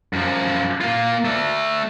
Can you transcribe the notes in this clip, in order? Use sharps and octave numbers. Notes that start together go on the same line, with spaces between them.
F#2 F3
A#3 F4
A3 D5